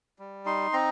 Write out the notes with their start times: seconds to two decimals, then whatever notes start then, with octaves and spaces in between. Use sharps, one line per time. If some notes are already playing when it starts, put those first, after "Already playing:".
0.19 G3
0.46 D#4 C6
0.73 C4 A#5